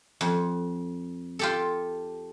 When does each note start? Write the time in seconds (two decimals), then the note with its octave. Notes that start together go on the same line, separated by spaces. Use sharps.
0.21 F2
1.39 F4 G4 A4